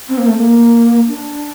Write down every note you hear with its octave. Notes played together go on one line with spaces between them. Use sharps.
C4
A#3
A3
A#3
D4